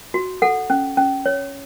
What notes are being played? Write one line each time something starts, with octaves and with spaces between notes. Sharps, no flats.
F#4
A4 F#5
C#4
C#4
C#5